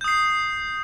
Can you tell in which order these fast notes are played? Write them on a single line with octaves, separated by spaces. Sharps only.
G6 D#6 C7